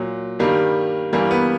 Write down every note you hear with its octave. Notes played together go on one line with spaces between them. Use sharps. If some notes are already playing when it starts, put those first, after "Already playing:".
Already playing: A#2 F#3
G2 D#3 G3 A#3
G2 E3 G3 A#3
B3